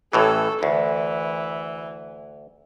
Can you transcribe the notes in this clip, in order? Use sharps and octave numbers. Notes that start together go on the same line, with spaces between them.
A1 A2 E3 A4
D2 E3